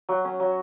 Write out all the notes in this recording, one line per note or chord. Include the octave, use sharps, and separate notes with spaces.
F#3
C#4
F#3